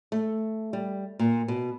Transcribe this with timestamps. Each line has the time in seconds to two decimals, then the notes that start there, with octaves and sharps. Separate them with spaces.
0.12 A3
0.73 G3
1.19 A#2
1.48 B2